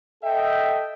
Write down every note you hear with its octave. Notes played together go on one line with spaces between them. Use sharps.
A4 D#5 E5 G5